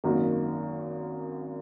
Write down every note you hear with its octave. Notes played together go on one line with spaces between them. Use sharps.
G#1 F#2 D#3 A#3 F#4